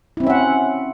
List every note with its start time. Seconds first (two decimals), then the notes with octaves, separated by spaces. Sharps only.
0.17 E4
0.20 C4
0.23 C#4
0.27 E5
0.30 F#5